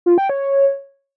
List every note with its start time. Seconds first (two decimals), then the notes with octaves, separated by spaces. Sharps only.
0.06 F4
0.18 G5
0.29 C#5